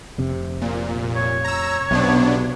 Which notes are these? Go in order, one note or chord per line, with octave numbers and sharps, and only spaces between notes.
F1 C3
A#2
C#5
A#5 E6
B1 C3 B3 D4